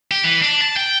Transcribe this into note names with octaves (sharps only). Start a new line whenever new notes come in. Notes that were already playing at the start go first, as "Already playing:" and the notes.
G4
E3
D4
A5
G5